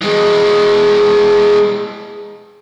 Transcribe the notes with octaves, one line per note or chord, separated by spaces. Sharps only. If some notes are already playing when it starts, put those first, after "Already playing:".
E3 G#3